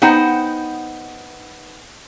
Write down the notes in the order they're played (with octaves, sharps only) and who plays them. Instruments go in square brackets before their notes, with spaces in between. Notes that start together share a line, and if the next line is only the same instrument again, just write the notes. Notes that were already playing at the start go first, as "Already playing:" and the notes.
[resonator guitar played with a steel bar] B3 D#4 C5 F#5 G5